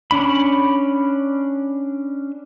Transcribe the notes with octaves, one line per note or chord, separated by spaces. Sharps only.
C#4 D4 B5